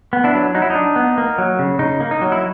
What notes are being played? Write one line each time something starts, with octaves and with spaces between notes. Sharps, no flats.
B3
D4 E4
F#3
F#3 D#4
E4
D#4
D4
B3
A#3
F#3
C#3
C#3 D#4
A#3
D#4
F#3
E4